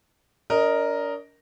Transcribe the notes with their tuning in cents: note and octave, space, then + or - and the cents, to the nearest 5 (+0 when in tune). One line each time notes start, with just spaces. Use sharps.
D4 -40 A#4 +0 D#5 +0